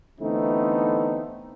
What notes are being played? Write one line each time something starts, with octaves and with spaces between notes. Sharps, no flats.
D3 E3 A3 B3 C4 D#4